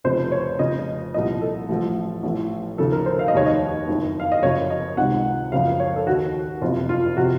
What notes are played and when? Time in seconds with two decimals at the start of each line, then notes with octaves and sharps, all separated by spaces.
0.04 F1 F2 C#3 F3 C5
0.32 C#5
0.59 F1 F2 C#3 F3 D#5
1.14 C2 A#2 F3 D#5
1.41 A4
1.69 A1 A2 F3
2.23 A1 A2 F3
2.78 D#2 C#3 F3 A4
2.92 A#4
3.06 C5
3.19 F5
3.28 D#5
3.33 F1 D#2 D#3 C#5
3.46 D#5
3.87 F#1 F2 D#3
4.20 F5
4.32 D#5
4.42 F#1 F#2 C#3 F3 C#5
4.70 D#5
4.97 C#2 C3 D#3 F#5
5.52 F#1 F#2 C#3 F3 F5
5.80 C#5
5.96 A4
6.07 D#2 D#3 F#4
6.62 F#1 F2 C3 F3 F4
6.89 F4
7.17 C3 F3 F#4